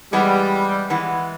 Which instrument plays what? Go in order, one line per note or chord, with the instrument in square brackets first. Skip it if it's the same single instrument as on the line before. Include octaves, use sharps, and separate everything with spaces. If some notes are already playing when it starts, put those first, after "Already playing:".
[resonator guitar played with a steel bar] E3 G#3 B3 [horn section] G3
[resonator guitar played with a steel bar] E3 G#3 B3